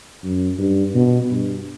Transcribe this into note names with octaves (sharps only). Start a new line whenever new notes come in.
F#2
G2
B2
G2